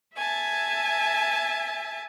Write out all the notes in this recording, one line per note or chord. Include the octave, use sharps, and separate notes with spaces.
E5 G#5 A5